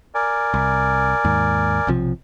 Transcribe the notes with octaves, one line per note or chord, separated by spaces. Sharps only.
A#4 D5 G#5
C2
D#2 G#2
B1 C3 F3